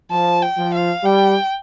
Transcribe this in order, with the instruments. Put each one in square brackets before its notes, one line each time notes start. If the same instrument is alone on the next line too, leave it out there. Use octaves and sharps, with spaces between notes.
[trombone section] F3 [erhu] A5
[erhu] G5
[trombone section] F3
[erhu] F5
[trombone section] G3 [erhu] G5